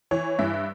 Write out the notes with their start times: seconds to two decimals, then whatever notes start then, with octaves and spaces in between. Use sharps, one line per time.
0.11 E3 C#5
0.39 G2 E5